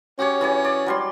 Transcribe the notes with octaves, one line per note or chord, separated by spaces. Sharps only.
C#4 F#4 G4 C#5
E3 G#4 C#5
D5
F#3 G3 C6